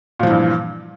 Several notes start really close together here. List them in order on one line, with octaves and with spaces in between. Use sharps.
A#2 F3 E3 G2